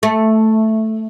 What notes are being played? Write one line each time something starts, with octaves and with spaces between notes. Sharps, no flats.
A3